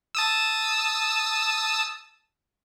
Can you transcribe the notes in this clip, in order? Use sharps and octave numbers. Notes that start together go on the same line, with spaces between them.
A5 D#6 E6